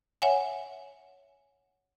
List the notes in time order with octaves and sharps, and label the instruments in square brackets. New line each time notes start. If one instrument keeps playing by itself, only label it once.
[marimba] C#5 E5 F#5 G#5